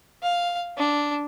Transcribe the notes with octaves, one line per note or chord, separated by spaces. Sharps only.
F5
D4